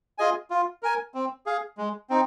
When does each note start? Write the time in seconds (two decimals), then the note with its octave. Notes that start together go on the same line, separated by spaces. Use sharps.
0.18 F4 G#4 D#5 G#5
0.50 F4
0.83 A#4 G#5
1.14 C4
1.46 G#4 F5
1.78 G#3
2.10 C4 D#4